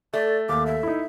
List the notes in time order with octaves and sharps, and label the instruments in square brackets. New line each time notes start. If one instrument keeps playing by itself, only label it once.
[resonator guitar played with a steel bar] A3 [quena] D5
[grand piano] D#2 [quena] D6
[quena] E5
[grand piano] D#4 E4